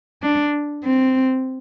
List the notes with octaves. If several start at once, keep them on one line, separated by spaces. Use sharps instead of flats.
D4
C4